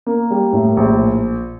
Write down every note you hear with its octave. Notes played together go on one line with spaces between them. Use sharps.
A#3
G3
A2
A#1